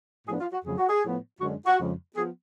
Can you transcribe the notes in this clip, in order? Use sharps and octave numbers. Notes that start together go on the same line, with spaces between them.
A2 F3 B3 D4 G#4
F4
F#4
F2 C#3 F#3 A3 G#4
F#4
G#4
A2 F3 B3
F#2 D3 G#3 D4 F#4
F#4
F2 C#3 F3 G#3
F3 B3 G#4